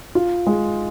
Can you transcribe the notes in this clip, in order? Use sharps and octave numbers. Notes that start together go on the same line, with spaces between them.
F4
G#3